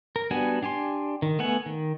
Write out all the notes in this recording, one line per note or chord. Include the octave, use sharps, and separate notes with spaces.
A#4
G3 B3 D4 F#4 G#5
D4 G4 G#5 C6
D#3
A3 B3 F#5 G#5
D#3